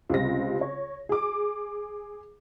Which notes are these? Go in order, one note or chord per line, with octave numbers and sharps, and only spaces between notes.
C#2 C3 G3 A#6
C#5
G#4 D6